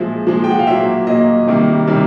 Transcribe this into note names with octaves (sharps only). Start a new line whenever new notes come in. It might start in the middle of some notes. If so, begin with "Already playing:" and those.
Already playing: A#2 F3 G#3 E5
A#2 F3 G#3
G5
F#5
F5
A#2 F#3 A#3 E5
A#2 F#3 A#3 D#5
C3 D#3 G3 A#3
C3 D#3 G3 A#3